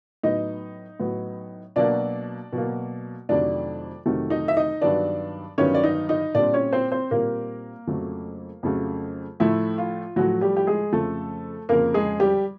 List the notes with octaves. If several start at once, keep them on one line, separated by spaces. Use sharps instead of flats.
A2 F#3 B3 D#4 D#5
A2 F#3 B3
B2 F#3 A#3 D4 D5
B2 F#3 A#3
F2 C3 D#3 F#3 A3 D4 D5
F2 C3 D#3 F#3 A3
D#4 D#5
E5
D#4 D#5
G2 D#3 F#3 B3 D4 D5
G2 D#3 F#3 B3 C#4 C#5
D5
D#4 D#5
D#4 D#5
A#2 G3 C4 D4 D5
C#4 C#5
C4 C5
C4 C5
A#2 G3 A#3 C4 A#4
F2 C#3 F#3 A3
F2 C#3 F#3 A3
A2 F3 A3 E4
F4
A2 F3 F#3 A3 F#4
G3 G4
G4
G#3 G#4
F2 C#3 F3 A3 A4
F2 C#3 F3 A#3 A#4
G#3 G#4
G3 G4